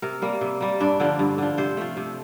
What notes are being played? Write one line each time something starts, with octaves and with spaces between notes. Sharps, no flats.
C3 A#4
G3 A#3
C3
G3 A#3
G2 D4
D3 F3
G2
D3 F3
C3 C5
F3 A3
C3